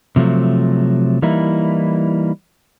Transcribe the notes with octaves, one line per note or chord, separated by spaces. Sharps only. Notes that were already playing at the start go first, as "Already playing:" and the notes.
C3 F3 F#3 A3
E3 G3 A#3 D#4 E4